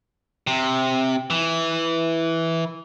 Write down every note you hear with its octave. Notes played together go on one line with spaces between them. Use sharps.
C3
E3